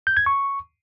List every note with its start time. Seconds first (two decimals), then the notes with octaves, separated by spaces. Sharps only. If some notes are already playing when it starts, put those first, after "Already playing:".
0.07 G6
0.17 G#6
0.26 C#6